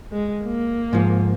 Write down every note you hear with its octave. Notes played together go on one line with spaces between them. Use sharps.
G#3
A#3
G#2 F3